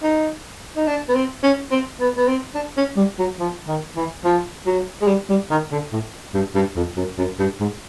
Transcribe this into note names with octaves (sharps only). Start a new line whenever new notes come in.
D#4
D#4
D4
B3
C4
C#4
C4
B3
B3
C4
D4
C#4
G3
F#3
F3
D#3
E3
F3
F#3
G#3
G3
G3
D#3
D3
A2
G2
G2
F2
F#2
F#2
G2
G#2